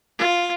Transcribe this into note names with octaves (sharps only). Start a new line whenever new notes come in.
F4